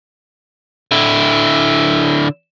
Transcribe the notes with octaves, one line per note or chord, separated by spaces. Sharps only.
D3 E4